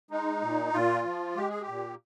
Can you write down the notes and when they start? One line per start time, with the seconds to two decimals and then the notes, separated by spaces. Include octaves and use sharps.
0.11 G#3 D#4
0.42 A#2
0.73 A#2 F4
1.05 F3
1.36 G#3 G4
1.49 G#4
1.61 G4
1.68 A#2